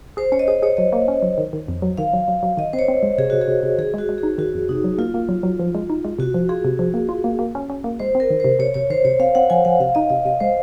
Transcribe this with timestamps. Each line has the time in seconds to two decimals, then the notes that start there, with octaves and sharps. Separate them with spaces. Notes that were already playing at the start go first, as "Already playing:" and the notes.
0.17 G#4 C5
0.32 C#4 C#5
0.39 D#5
0.48 G#4 C#5
0.63 G#4 C#5
0.77 F#3 D#5
0.93 A#3
1.08 C#4
1.22 F#3
1.38 D#3
1.53 D#3
1.68 F2
1.82 F#3
1.97 D#3 F5
2.14 F#3
2.28 F#3
2.43 F#3
2.57 D#3 D#5
2.73 C4 C5
2.79 C#5
2.88 C4
3.03 G#3
3.18 C3 G#4
3.30 C3 F#4
3.42 G#4
3.48 C3
3.63 C3
3.78 D#3 G#4
3.94 G#3 F#4
4.09 G#3
4.18 G#4
4.23 D#4
4.38 D#3 F#4
4.54 F2
4.69 C3 D#4
4.84 F#3
4.98 A#3 F4
5.14 A#3
5.29 F#3
5.43 F#3
5.60 F3
5.75 G#3
5.90 D#4
6.05 G#3
6.18 C3 F#4
6.34 F3
6.49 F4 G#4
6.65 C3
6.79 F3
6.94 A#3
7.09 F4
7.24 A#3
7.39 A#3
7.55 C#4
7.70 C#4
7.84 A#3
7.99 G#3 C5
8.15 C4
8.20 A#4
8.30 D#3
8.40 C5
8.44 C3
8.59 C3 C#5
8.74 C3 C#5
8.90 D#3 C5
9.05 C3 C#5
9.20 C4 F5
9.35 C4 F#5
9.50 F3 G#5
9.65 F3 F#5
9.80 C3 F5
9.95 D#4 D#5
10.10 C3 D#5
10.25 C3 D#5
10.40 G#3 C5